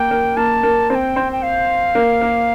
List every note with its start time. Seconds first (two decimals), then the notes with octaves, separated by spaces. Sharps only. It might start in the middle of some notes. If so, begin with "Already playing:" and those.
Already playing: A#3 A#4 G5
0.11 A#3 A#4
0.37 A#3 A#4 A5
0.63 A#3 A#4
0.90 C4 C5 A5
0.95 G5
1.16 C4 C5
1.32 G5
1.43 F5
1.95 A#3 A#4
2.21 A#3 A#4